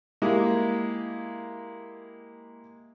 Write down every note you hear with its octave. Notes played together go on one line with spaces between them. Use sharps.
G#3 A#3 E4 G4